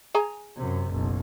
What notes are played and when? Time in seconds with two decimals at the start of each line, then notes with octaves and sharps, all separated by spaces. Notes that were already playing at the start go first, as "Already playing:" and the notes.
0.15 G#4 G#5 A#5
0.56 F#2 C3
0.90 F#1 B1